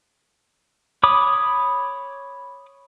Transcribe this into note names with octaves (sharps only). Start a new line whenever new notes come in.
C#5 B5 D6 D#6